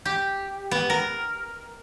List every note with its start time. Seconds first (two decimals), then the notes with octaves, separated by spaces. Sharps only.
0.05 G4
0.71 B3
0.90 A#4